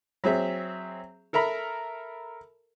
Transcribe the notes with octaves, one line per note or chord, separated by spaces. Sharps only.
F#3 C4 G#4 E5
A4 A#4 E5 A#5 B5